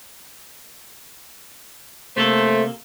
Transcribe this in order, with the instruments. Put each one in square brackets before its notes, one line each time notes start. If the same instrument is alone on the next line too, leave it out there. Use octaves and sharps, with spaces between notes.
[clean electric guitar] C3 A#3 A4 [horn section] A3 C5